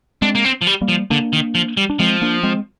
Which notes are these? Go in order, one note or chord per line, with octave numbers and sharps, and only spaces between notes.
G#3 C4 D4
A#3
C4
F3
G3
G3 A#3
F3
D3 A#3 D4
D#3
F3
G3
D4
F3 G#3 C4
A#3 D4
G#3 C4